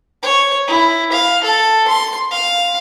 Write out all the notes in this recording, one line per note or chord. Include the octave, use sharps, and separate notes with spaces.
C#5
E4
F5
A4
C6
F5